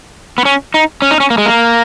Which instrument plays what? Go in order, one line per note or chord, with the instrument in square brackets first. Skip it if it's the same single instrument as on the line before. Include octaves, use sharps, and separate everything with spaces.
[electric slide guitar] B3
C#4
D#4
C#4
D#4
C#4
A#3
G#3
A#3